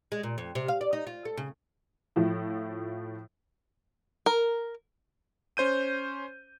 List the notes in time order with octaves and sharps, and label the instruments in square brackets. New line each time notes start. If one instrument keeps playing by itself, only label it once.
[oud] G#3
A#2
F2
C3
F5
D5
D#4
F4
A4
C#3
[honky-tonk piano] A2 F3 E4
[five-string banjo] A#4
[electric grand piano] C#4 C5 G6 D#7